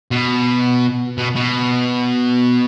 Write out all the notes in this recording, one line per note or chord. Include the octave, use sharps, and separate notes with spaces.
B2
B2
B2